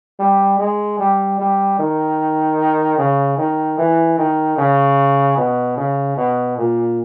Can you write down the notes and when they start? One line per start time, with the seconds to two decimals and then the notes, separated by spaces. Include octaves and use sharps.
0.20 G3
0.59 G#3
0.99 G3
1.39 G3
1.79 D#3
2.99 C#3
3.38 D#3
3.78 E3
4.18 D#3
4.58 C#3
5.37 B2
5.77 C#3
6.17 B2
6.58 A#2